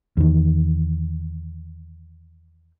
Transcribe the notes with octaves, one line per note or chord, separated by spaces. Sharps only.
E2 D#3